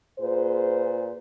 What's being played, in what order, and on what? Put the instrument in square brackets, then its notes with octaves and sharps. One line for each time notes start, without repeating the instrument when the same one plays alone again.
[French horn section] A#2 G#4 B4 C5